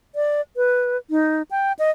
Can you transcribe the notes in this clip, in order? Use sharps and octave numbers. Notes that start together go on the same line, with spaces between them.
D5
B4
D#4
G5
D#5